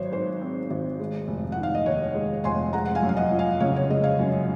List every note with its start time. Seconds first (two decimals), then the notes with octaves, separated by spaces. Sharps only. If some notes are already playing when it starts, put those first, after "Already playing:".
Already playing: G#1 F#3 C5 C#5
0.12 G#2 C5
0.41 C4
0.70 G#1
1.00 G#3
1.28 F1
1.52 F#5
1.57 D#3
1.63 F5
1.75 D#5
1.86 D#2 C#5
2.15 G#3
2.44 F1 G#5 C6
2.73 G#3 F#5 A#5
2.86 F#5
2.95 F5 G#5
3.02 F#2
3.09 F5
3.17 D#5 F#5
3.31 F3
3.39 F5 G#5
3.60 C#3 C#5 F5
3.76 C#5
3.90 G#3 D#5
4.03 C#5 F5
4.19 F#2